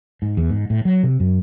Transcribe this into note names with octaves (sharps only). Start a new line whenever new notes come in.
G#2
E2
G#2
A2
F#3
C3
F#2